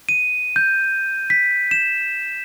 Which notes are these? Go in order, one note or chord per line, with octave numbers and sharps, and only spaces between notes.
D#7
G6
B6
E7